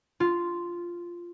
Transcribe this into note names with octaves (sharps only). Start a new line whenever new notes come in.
F4